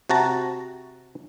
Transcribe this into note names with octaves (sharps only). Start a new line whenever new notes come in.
C3 F#4 A5 A#5